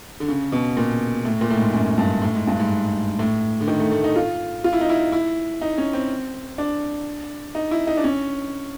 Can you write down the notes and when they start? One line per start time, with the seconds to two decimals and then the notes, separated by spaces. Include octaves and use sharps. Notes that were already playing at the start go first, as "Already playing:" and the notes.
0.20 D3
0.28 C#3
0.52 B2
0.77 A#2
1.25 A2
1.41 A#2
1.50 A2
1.58 G#2
1.73 F#2
1.98 G2
2.22 A2
2.35 G#2
2.47 G2
2.59 G#2
3.19 A2
3.61 D3
3.68 D#3
3.80 A3
3.92 A3
4.04 D#4
4.16 F4
4.64 F4
4.73 E4
4.81 D#4
4.89 E4
5.12 E4
5.61 D#4
5.78 C#4
5.93 C4
6.58 D4
7.55 D#4
7.71 E4
7.87 D#4
7.97 D4
8.04 C#4